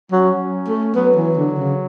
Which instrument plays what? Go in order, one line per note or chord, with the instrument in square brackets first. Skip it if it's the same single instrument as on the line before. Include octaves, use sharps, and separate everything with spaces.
[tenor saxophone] F#3 [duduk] C#4
[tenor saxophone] A3
[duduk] F#3 [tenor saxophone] B3
[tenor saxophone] E3
D3
C#3